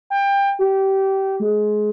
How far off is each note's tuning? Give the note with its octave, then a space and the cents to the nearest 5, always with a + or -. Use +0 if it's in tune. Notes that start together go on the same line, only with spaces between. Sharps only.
G5 +25
G4 -20
G#3 +20